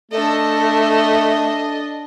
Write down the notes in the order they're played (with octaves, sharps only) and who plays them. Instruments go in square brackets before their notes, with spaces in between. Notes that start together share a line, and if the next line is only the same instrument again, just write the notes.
[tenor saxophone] A3 [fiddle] D4 D#5 [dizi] A4